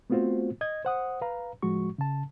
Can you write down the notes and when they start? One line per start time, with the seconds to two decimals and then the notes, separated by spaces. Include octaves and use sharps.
0.10 A3 B3 C4 F4 F#4 C5
0.61 D#5 G#6
0.85 C5 F#5 D#6
1.21 B4 F5 A#5
1.62 A2 F3 G#3 F#4 C#6
1.98 C#3 A5